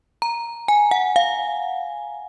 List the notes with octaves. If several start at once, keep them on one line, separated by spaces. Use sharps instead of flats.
A#5
G#5
F#5
F5